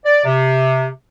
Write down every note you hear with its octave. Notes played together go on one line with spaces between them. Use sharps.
D5
C3